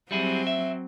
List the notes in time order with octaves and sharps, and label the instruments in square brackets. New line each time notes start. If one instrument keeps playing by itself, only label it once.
[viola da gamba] F#3 C4 [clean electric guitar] G3 E4 G#4
[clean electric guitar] E5